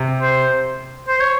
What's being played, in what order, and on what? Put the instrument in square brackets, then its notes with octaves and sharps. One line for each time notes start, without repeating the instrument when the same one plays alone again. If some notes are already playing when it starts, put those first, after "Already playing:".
Already playing: [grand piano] C3
[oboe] C5
C5
C#5